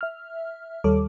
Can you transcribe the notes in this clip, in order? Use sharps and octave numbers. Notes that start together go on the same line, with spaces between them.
E5 F6
D#2 G3 A4 C#5 D6